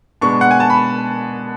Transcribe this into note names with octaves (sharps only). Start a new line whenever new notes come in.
B2 G#3 B3 D4 C#6
F#5
G#5
A5
B5